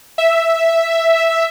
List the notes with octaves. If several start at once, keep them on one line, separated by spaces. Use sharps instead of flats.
E5